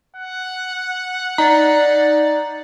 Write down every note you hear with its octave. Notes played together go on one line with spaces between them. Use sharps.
F#5
D#4 D5 A#5